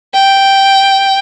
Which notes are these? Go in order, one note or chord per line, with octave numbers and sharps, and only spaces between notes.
G5